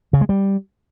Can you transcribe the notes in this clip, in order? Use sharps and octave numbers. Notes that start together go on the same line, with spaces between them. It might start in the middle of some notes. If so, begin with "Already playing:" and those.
C#3
G#3
G3